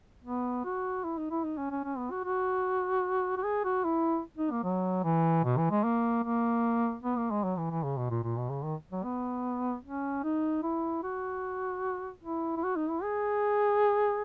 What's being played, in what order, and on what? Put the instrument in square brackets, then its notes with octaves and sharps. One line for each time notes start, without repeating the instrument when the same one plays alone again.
[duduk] B3
F#4
E4
D#4
E4
D#4
C#4
C#4
C#4
B3
F#4
F#4
F#4
G#4
F#4
E4
D#4
A#3
F#3
E3
B2
E3
G#3
A#3
A#3
B3
A#3
G#3
F#3
E3
E3
C#3
B2
A#2
A#2
B2
C#3
D#3
F#3
B3
C#4
D#4
E4
F#4
E4
E4
F#4
D#4
E4
G#4